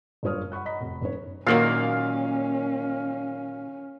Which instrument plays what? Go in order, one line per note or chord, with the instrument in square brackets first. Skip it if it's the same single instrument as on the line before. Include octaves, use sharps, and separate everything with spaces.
[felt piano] F#1 G2 F4 C#5 D#6 F6
F#5 B5 C#6 F#6
D#5 A#5 B5 B6
F1
F#1 C#4 D#4 C#5
[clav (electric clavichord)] A#2 D#3 [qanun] F#3 A#3 A#4 [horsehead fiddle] C#4 [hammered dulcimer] F5